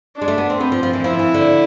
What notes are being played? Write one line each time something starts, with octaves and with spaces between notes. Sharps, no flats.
D4
G#3
A3
B3
C4
B3 C4
F3
F3
E3
F3 E4
E3
D3